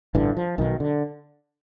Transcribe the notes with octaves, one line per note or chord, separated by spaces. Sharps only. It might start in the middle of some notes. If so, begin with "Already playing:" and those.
A1 G2 D3 E3
F3
B1 B2 D#3
D3